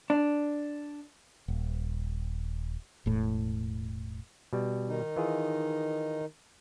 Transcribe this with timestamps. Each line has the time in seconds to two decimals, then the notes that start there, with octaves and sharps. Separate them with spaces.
0.10 D4
1.48 D#1
3.06 E1 A2
4.53 B2 G3
4.88 D#3 D#4
5.16 E3 F4 G#4